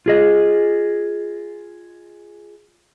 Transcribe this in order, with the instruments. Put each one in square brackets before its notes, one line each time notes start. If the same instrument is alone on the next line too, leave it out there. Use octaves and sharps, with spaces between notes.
[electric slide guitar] F4 G#4 D#5